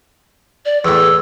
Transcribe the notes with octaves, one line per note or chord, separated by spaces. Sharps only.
D5
E2 A2 E6